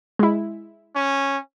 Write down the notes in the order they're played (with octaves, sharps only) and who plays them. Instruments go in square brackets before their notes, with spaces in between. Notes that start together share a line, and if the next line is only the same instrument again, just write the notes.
[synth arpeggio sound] G#3 E4
[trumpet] C#4